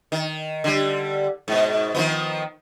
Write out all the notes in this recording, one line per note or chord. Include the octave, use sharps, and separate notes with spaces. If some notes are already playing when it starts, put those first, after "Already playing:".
D#3
D3 G3
G#2 B2
D#3 F3 B3